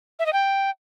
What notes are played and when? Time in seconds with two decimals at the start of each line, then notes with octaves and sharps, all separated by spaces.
0.19 E5
0.26 D#5
0.33 G5